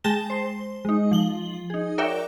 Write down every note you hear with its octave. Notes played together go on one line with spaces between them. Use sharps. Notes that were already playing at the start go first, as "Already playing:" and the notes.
G#3 G5 A5 A#6 E7 G7
C5
G#3 D#4
F3 F#7 G7
D#4 G#4
F#4 A#4 C#5 D5 E5 G5